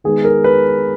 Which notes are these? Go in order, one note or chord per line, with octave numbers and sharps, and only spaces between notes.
D#3 G#3 B3 G#4
A#4
B4